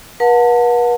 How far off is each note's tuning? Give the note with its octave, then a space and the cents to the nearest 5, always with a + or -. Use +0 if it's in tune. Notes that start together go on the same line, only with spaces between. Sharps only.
B4 -45 F#5 -35 A5 +25